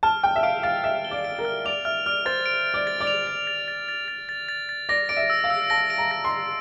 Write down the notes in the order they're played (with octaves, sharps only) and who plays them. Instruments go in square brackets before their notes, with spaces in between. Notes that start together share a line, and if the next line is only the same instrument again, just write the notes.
[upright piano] A5 [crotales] F6
[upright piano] G5 [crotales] F6
[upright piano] E5
[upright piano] F5 [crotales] D7
[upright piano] F5 [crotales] A6
[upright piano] E5 [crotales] F6
[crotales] G7
[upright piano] D5
[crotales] D7
[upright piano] A#4
[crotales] F6
[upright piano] D5 [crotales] F7
[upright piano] E5 [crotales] F6
[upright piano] D5 [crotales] F6
[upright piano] C5 [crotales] A6
[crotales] D7
D7
[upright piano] D5
[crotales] A6
[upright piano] D5
[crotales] F7
A6
A6
A6
A6
A6
A6
A6
A6
[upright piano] D5 [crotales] A#6
[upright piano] D5 [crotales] D7
[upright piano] E5
[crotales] E6
[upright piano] F5
[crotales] E6
[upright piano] A5 [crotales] A#6
[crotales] D7
[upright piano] A#5
[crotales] A#6
[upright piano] C6
[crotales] A#6